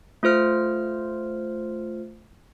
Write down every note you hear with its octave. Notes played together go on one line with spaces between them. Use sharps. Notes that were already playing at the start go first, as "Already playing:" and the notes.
A3 F4 C5 F6